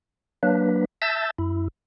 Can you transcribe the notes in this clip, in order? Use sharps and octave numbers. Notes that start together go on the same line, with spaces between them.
F#3 A#3 D4 B4
E5 A5 E6 G6 A6
F#2 E4